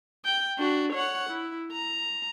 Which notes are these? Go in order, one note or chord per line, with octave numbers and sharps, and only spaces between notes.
G5
D4 F#4
C#5 F#5
E4
A#5